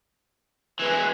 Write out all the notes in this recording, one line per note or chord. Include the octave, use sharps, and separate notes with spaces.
E3 G#3 B4